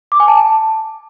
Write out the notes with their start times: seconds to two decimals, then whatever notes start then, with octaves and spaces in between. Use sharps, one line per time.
0.12 D6
0.20 G#5
0.28 A5